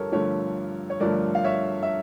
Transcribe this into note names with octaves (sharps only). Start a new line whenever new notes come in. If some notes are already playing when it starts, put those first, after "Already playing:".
Already playing: G2 D3 F3 G4 A4 A#4 C#5
G2 D3 F3 A3 A4 C#5
C#5
G2 D3 F3 A3 A#4 D5
F5
C#5 E5
E5